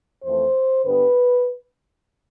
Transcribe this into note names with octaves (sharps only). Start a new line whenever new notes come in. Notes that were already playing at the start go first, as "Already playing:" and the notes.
F2 E3 A3 C5
G2 D3 G3 B3 B4